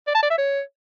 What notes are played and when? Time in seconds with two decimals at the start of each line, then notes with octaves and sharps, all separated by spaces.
0.07 D5
0.15 A5
0.23 D5
0.30 E5
0.38 C#5